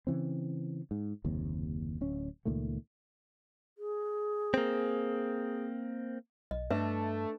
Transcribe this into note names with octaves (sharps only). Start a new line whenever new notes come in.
C#3 E3 C4
G#2
F#1 D#2 C3
D1 C#4
C#2 A#2 D#3 A3
G#4
A#3 C4
B1 D#5
G2 A3 D4 B4 E5